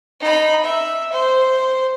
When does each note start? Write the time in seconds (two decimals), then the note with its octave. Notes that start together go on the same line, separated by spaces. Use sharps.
0.21 D#4 B5
0.63 E5
1.12 C5